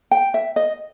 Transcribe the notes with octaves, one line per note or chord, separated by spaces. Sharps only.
G5
E5
D#5